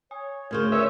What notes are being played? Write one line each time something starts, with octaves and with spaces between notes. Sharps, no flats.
C#5 G#5 D#6
D2 C#3 A#4 C5 C#6 G#6
C#4 A#4 B4 C#5 D5 E5